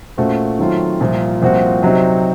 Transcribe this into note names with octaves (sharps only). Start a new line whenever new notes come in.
A#2 A3 C#4 F#4 C5
D#3 F#3 A3 C4 F4
C2 A#2 F3
C2 A#2 F3 C4 F#4
C3 F#3 C4 D#4